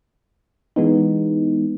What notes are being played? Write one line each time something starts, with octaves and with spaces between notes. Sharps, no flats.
E3 G#3 B3 D#4